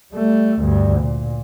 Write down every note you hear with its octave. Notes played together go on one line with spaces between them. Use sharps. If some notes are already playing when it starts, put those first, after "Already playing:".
G3 A3
D2 G2
A#2